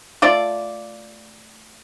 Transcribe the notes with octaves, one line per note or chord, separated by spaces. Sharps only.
A3 F4 D5